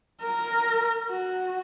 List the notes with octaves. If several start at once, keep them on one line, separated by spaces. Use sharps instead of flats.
A#4
F#4